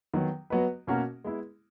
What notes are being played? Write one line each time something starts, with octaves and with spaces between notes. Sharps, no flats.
D#3 F#3 B3
F#3 B3 F#4 B4 D#5
B2 A#3 C#4 F#4 A#4
G#3 B3 E4